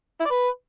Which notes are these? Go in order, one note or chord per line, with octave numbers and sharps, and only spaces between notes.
E4
D5
B4